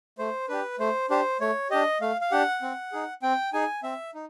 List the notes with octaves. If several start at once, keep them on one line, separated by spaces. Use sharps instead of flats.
A3 C5
D4 G4 B4
A3 C5
D4 G4 C5
A3 C#5
D4 G4 D#5
A3 F5
F5
D4 G4 F#5
C4
D#4 G#4
C4 G5
D#4 G#4 G#5
C4 E5
D#4